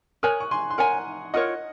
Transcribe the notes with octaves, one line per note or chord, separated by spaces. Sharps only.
A#4 C#5 G#5 D#6 F#6
C#6
G#5 C6
C6
A#4 C#5 F#5 G#5 A#5
F4 A#4 C#5 D#5 F#5